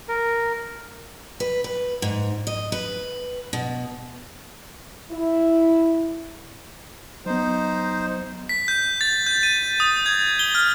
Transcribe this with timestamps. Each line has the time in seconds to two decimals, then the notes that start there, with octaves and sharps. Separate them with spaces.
0.08 A#4
1.40 B4
1.64 B4
2.02 G#2
2.47 D#5
2.72 B4
3.53 B2
5.12 E4
7.26 F#3 B3 D#4 C5
8.49 B6
8.68 G6
9.01 A6
9.26 G6
9.43 D#7
9.80 D#6
10.06 G#6
10.39 G7
10.55 F6